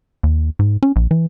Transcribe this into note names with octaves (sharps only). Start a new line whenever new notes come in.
D#2
G#2
C#4
A#1
E3